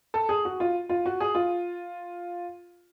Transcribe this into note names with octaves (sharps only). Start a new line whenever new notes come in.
A4
G#4
F#4
F4
F4
F#4
G#4
F4